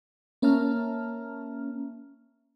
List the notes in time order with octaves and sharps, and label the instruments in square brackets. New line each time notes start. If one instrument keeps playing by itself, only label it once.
[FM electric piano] A#3 C#4 E5 A5 A#5 F6